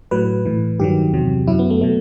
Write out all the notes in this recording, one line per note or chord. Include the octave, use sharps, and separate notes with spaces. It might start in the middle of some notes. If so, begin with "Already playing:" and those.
A2 F#3 B4
A2 E3
G2 D#3 F#3 G4
E2 C3 F#3
F#2 F#3 E4
B3
A3
B2 F#3 A3